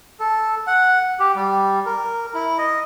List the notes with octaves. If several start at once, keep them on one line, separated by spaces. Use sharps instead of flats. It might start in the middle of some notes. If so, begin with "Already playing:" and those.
A4
F#5
G4
G3
A#4
E4
D#5